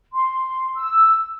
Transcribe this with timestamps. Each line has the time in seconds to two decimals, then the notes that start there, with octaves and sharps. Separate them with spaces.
0.12 C6
0.75 E6